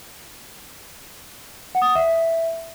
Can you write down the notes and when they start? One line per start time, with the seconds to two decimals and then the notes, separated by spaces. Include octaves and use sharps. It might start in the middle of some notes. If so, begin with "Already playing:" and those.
1.75 F#5
1.82 D#6
1.89 F#5
1.95 E5